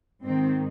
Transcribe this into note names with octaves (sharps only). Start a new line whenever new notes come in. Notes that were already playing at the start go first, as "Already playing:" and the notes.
G#2 D#3 C4